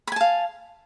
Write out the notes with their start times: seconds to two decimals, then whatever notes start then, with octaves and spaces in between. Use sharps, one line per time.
0.07 B5
0.12 G#5
0.16 A5
0.21 F5